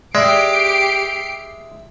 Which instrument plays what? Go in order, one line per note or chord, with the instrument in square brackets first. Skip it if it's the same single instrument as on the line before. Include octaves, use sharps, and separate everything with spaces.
[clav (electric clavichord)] G#3 [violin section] G4 C7 D7 [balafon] D5 [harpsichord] E5